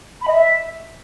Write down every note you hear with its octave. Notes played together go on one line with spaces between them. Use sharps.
B5
D#5
E5